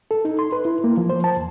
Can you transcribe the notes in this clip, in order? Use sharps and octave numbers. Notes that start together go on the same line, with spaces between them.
A4
D#4
C6
B4
E4
A#3
F3
C5
A5
E2